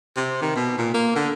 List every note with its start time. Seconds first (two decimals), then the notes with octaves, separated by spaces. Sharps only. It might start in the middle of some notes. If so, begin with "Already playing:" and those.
0.16 C3
0.42 D#3
0.56 B2
0.78 A#2
0.94 A#3
1.16 D3